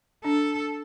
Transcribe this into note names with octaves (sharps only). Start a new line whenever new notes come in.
D4 A4